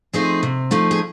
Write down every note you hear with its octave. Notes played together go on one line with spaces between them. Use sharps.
F3 A3 C4 D#4 G#4
C3
F3 A3 C4 D#4
G#4